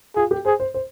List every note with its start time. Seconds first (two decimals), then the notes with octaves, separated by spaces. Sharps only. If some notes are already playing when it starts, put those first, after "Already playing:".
0.16 F4 G#4
0.31 G4
0.45 G#4 C5
0.60 C5
0.74 C5